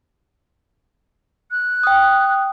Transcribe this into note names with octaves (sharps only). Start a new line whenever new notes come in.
F#6
G5 D#6